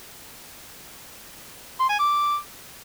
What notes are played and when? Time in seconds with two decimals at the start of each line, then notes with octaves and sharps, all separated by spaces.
1.79 C6
1.89 G#5
1.99 D6